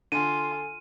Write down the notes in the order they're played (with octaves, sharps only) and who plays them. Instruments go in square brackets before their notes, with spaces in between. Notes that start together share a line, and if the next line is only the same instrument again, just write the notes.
[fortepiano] D3 [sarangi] F4 [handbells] A4 G#5 [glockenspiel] D#7